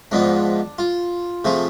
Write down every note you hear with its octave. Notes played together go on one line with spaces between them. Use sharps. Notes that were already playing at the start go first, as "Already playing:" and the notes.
G#2 F3 B3 D4
F4
C3 F3 A3 G#4